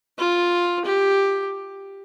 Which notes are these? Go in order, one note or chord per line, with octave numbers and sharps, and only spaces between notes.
F4
G4